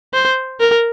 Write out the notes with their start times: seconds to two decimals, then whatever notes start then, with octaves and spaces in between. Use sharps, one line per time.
0.14 C5
0.60 A#4